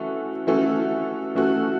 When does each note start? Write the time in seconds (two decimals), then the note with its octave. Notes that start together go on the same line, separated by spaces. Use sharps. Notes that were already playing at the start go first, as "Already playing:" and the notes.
Already playing: E3 A3 C#4 F#4 A4
0.47 E3 A3 C#4 F#4 A4
1.35 E3 A3 C#4 F#4 A4